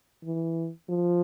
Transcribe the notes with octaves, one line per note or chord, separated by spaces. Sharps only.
E3
F3